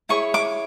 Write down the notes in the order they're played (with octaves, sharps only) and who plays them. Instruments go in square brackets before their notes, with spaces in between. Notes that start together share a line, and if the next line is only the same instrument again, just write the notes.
[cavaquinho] E4 G#4 C#5 C#6
D6